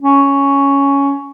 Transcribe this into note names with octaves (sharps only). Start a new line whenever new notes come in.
C#4